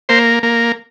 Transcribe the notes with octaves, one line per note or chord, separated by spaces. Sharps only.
A#3 C5
A#3